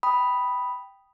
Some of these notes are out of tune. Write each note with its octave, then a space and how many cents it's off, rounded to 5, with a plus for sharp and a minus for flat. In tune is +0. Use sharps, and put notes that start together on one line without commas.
G5 +0 B5 +0 D#6 +0